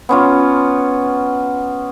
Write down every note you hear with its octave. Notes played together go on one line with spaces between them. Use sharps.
B3 C#4 F4